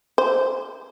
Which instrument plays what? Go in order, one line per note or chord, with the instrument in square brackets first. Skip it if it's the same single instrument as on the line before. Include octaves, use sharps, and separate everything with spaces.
[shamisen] C5